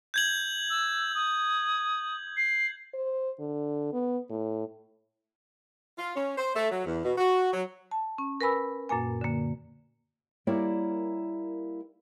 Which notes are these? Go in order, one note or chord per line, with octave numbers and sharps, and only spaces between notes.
G6 G#6 F#7
E6
D#6
C7
C5
D3
B3
A2
F4
C#4
C5
A3
F#3
E2
B2
F#4
F#3
A5
C#4
A#4 B4 G#5 B5 E6
F#2 A#2 A#3 G#5
D3 A#3
G3 A#3 E4 A#4 C#5 D5